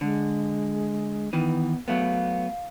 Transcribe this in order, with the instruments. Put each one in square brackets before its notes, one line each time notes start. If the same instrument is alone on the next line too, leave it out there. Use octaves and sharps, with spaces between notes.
[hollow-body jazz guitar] D3 [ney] G#3
[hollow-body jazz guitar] D#3 E3 [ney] B3
[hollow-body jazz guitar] F#3 A3 B3 [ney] F5